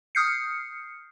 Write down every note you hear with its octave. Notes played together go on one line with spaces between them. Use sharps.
D#6 F6 G6 C7 C#7